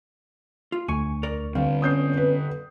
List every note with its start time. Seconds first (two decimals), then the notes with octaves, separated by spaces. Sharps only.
0.72 F4
0.88 D2 G#5 C#6
1.23 A#4 D5
1.55 D3 G3 C4 F5
1.82 B3 C#4 C#5 D#6 G6 C7
2.17 B4